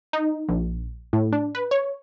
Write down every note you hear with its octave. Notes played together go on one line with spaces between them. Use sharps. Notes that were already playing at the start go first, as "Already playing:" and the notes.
D#4
A#1
A2
D4
B4
C#5